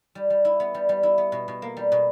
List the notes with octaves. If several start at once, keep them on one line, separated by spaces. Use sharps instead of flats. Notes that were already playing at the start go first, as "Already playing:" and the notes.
G3
G3
E4
B3
G3
G3
E4
B3
B2
B2
A#3
G3
B2